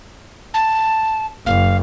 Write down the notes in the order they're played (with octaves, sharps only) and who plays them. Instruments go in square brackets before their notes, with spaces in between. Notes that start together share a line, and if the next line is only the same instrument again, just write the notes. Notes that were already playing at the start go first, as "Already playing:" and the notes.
[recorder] A5
[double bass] F#1 [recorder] F5